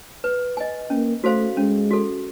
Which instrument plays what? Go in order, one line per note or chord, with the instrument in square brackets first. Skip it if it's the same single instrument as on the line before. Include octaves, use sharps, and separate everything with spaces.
[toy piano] B4
D#5 G#5
[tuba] A#3 [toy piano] C#4
[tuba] A3 [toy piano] F#4 A4 C5 F5
[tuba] G#3 [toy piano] C#4
[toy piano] F#4 A4